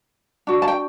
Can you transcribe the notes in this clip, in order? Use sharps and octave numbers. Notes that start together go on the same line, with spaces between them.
D4 F#4
A5
G5